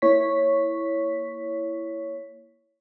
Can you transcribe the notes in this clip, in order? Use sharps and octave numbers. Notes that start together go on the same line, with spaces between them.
A#3 E4 C#5 C#6 B6